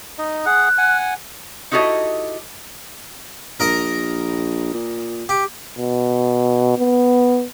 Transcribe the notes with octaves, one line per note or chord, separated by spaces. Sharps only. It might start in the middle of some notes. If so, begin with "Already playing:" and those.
D#4 D#5
G#4 F#5 F#6
F#5 G#5
D#4 E4 F#4 G4 A4 D#5
A#1 A#4 D#5 A#5
A#2
G4
B2
B3